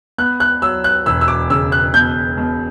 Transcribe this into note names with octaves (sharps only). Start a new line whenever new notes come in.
B3 F#6
F#6
F#3 E6
F#6
E1 E6
E6
D6
C#3 E6
F#6
B2 G6
B2